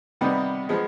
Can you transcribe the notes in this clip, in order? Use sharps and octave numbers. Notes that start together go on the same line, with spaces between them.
C3 D#3 G3 B3 D#4
F3 G#3 B3